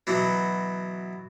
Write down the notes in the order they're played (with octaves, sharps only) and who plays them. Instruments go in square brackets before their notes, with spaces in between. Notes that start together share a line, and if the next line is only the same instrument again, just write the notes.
[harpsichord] B2 E3 F#3